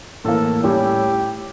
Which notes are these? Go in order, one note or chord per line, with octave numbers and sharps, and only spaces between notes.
A2 E3 A#3 A4
A2 G3 C#4 G4